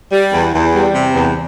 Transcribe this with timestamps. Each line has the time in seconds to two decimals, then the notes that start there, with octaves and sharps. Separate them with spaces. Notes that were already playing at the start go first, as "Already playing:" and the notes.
0.12 G3
0.33 E2
0.54 E2
0.74 G3
0.94 C3
1.15 E2